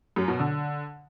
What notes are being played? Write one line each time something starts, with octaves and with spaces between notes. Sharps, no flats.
F#2
B2
D3